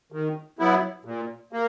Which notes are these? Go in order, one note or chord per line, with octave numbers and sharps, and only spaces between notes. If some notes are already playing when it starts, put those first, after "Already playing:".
D#3
F#3 B3 E4
A#2
A#3